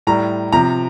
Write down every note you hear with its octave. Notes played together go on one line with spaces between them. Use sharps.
A2 G3 A#5
C3 F3 A#5